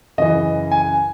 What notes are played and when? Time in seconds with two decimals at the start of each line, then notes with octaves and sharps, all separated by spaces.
0.18 F#2 C#3 E3 D#5
0.71 G#5